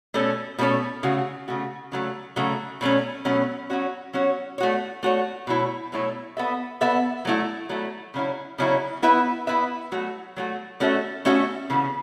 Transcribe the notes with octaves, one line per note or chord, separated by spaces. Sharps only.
B2 A3 C#4 A4 C#5
B2 A3 C#4 A4 C#5
C#3 A3 F#4
C#3 A3 F#4
C#3 F#3 A3
C#3 F#3 A3
B2 F#3 A3 C#4
B2 F#3 A3 C#4
F#3 C#4 F#4 C#5
F#3 C#4 F#4 C#5
A3 F#4 C#5
A3 F#4 C#5
B2 F#3 A3 E4 C#5
B2 F#3 A3 E4 C#5
B3 A4 E5
B3 A4 E5
F#3 A3 E4
F#3 A3 E4
C#3 F#3 C#4 E4
C#3 F#3 C#4 E4
B3 E4 B4 E5
B3 E4 B4 E5
F#3 A3 F#4
F#3 A3 F#4
A3 C#4 F#4 A4 E5
A3 C#4 F#4 A4 E5
C#3 E3 B3